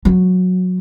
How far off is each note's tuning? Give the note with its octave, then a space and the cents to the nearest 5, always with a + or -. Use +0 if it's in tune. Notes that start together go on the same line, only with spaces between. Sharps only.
F#3 -15